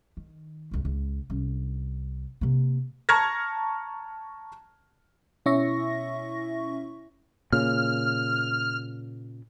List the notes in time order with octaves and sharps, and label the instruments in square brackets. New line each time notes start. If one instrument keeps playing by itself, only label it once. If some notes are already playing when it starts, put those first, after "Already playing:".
[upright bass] D#3
G1 C#2
C#2
C2 C#4
C3 A#3
[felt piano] A5 A#5 C#6 F6 G#6 A#6
[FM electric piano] B2 C#4 E4 E5 C#6 A#6
[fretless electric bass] A#2 C#3 [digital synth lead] F6